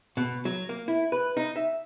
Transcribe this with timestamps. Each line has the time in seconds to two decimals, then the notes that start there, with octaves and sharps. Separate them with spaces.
0.17 B2
0.45 F#3
0.69 A#3
0.88 E4
1.12 B4
1.37 D#4
1.56 E5